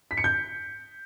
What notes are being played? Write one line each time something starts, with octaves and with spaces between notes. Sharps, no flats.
B6
C#7
G6